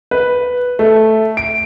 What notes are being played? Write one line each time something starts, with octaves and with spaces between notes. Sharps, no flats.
B4
A3
D7